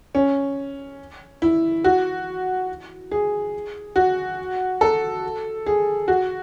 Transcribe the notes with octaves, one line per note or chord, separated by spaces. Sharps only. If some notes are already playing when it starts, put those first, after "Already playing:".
C#4
E4
F#4
G#4
F#4
A4
G#4
F#4